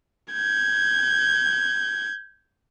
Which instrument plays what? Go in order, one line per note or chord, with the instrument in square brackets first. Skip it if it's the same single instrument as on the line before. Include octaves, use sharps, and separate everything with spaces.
[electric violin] G6 G#6